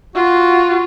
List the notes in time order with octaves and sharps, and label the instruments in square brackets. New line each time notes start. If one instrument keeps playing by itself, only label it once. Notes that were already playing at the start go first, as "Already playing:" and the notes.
[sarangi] F4 [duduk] F#4